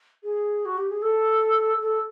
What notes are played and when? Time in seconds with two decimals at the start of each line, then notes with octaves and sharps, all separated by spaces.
0.24 G#4
0.65 F#4
0.78 G4
0.90 G#4
1.02 A4
1.81 A4